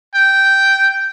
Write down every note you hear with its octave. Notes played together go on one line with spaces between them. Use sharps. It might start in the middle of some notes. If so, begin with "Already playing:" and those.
G5